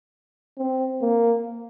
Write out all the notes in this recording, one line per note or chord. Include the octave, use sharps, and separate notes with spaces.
C4
A#3